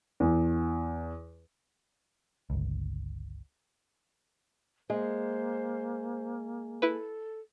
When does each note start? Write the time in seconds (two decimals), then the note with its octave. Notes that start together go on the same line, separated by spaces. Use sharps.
0.20 E2
2.50 G1 C#2
4.90 G#3 A#3 C5
6.82 E4 A4 B4